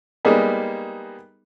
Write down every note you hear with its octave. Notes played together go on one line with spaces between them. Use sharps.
G3 G#3 A#3 B3 D#4 G#4